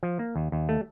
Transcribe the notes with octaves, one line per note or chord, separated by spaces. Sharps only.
F3
A#3
D#2
D#2
A3